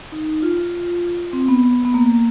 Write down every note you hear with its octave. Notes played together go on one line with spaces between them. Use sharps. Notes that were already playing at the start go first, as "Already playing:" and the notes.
D#4
F4
C4
B3
B3
A#3